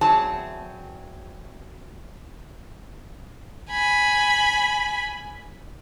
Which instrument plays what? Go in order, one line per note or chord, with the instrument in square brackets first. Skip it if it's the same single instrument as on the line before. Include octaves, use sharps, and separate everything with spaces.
[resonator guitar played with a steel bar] E2 F#3 C4 G#4 A5
[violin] G#5 B5